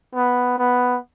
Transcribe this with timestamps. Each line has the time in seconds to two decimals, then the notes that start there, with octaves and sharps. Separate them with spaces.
0.15 B3
0.58 B3